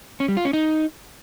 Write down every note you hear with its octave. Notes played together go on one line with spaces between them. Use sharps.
C#4
G3
F4
C#4
D#4